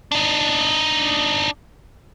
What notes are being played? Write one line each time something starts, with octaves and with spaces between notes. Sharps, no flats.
D4 D#4